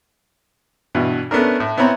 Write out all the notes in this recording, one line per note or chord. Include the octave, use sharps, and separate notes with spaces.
G2 B2 E3 F#4
A3 B3 C#4 D4 A#4
A2
B3 C4 E4 C#5 A#5 B5